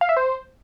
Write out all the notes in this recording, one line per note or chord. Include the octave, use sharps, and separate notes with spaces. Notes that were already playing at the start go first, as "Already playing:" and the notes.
F5
E5
C5